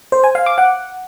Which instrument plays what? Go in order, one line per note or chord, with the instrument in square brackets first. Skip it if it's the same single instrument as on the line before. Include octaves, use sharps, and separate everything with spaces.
[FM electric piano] C5
G#5
F5
D6
F#5